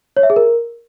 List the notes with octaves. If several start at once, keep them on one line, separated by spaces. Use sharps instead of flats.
C#5
E5
G#4
A#4